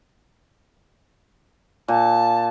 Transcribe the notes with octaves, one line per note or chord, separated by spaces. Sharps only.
A#2 A5